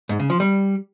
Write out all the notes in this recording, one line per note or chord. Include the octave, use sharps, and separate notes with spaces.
G#2
C#3
F3
G3